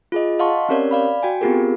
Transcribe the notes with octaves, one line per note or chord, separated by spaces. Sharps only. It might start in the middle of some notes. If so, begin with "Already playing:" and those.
F4 G#4 D#5
D#5 F5 F#5 A5 C6 C#6
C4 C#4 G4 A#4 C#5 D5
D5 F5 B5
F#4 G5 G#5
B3 C4 F4 G4 G#4 A#4